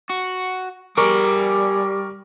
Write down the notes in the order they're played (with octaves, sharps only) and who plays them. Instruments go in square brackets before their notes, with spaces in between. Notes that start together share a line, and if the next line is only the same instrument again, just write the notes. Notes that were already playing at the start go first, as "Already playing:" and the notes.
[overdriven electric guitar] F#4
[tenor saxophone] G3 [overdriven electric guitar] G#4 D5 [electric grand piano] A#4 C#6 D6